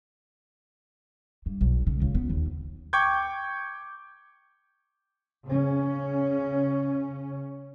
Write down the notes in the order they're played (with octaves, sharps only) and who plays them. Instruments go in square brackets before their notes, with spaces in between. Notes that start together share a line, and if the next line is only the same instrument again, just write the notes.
[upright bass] G2
B1
C#3
C#2
B3
D#2
[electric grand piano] G5 C#6 D6 G6 G#6
[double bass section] C#3 C#4